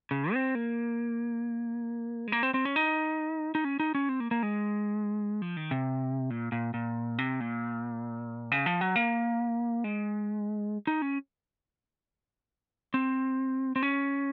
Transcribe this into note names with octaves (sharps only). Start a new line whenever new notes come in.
C#3
C4
A#3
G#3
A#3
C4
C4
C#4
D#4
D#4
C#4
D#4
C#4
C4
A#3
A#3
G#3
F3
D#3
C3
A#2
A#2
A#2
C3
A#2
C#3
F3
F#3
A#3
G#3
D#4
C#4
C4
C4
C#4